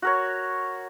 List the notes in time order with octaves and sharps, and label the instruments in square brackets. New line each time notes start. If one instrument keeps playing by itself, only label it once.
[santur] F#4 A#4 C#5